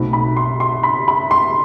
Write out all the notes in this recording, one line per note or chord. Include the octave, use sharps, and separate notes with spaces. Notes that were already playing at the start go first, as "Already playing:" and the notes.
Already playing: B1 B2 A3 C4 D#4 B5
B5
C6
C6
B5
B5
C6